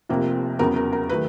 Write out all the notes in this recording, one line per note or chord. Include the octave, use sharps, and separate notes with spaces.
F1 F2 C3 F3 A#3
E2 C#3 F#3 B3 A#4
A#4
A#4
D#3 F#3 A3 B4